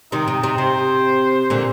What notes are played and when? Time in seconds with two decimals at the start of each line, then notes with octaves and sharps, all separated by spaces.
0.12 C3 D#3 D#4
0.28 C3
0.43 C3
0.58 C3 C5
1.50 A#2 D3